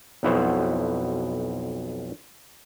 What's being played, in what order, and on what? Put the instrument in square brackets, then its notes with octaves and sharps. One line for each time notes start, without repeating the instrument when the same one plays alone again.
[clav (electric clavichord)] B1 F2 B3 E4 F#4 C5